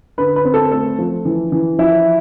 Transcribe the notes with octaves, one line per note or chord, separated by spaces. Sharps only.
D3 B4
B4
C4
A4
A3 A4
F3
E3
E3
F3 E4